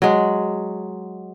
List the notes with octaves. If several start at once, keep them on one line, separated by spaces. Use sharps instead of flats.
F#3 G#3